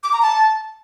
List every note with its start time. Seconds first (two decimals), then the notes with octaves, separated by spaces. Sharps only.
0.04 D6
0.13 A#5
0.22 A5